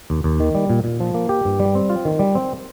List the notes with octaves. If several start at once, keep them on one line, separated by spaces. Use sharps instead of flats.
D#2
D#2
D#3
G3
A#2
A#2
F3
A#3
G4
G2
G3
C4
F4
D#3
G3
C4